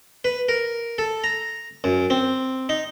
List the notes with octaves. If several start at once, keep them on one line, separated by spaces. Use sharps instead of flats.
B4
A#4
A4
A#5
F#2
C4
D#4